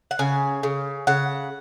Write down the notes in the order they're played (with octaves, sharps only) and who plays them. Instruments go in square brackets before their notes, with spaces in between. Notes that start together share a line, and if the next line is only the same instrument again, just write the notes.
[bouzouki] F#5
C#3 G#5
C#3
C#3 F#5